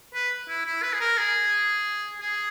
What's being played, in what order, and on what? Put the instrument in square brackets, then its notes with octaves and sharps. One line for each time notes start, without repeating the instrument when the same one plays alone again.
[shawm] B4
E4
E4
B4
G#4
A#4
G#4
G#4